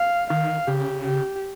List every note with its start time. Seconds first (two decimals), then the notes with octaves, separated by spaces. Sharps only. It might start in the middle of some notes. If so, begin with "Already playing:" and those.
Already playing: F5
0.30 D#3 F5
0.67 C#3 G4
1.04 G4